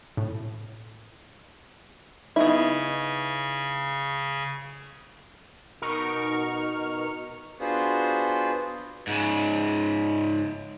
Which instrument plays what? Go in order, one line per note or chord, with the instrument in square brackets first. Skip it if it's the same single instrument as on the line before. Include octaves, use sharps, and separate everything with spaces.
[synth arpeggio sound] A2
[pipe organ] C#3 C#6 [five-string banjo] B3 D#4 E4
[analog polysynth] B2 D#4 A#4 C#6 F6
[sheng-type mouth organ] B3 D4 F4 F#4 G#4 C5
[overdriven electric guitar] G#2 C#3